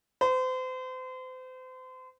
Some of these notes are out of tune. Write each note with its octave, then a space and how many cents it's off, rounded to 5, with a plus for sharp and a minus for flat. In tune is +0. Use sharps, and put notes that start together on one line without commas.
C5 -35